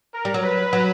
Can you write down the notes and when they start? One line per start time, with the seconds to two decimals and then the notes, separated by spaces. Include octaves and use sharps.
0.14 A#4
0.25 G3
0.34 F#3
0.44 B4
0.73 F#3